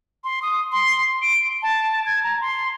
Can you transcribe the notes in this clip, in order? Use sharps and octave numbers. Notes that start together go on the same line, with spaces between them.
C6
D#6
C6
D7
A5
G#6
A#5
C6